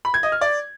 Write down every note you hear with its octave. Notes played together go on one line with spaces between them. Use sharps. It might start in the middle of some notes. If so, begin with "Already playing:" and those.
B5
G#6
D#5
F6
D5